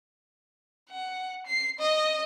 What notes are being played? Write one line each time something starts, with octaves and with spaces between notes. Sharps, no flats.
F#5
C7
D#5